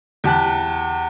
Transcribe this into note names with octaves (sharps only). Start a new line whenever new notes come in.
E2 G4 A5 F#6